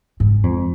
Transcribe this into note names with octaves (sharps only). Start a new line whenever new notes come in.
G#2
F2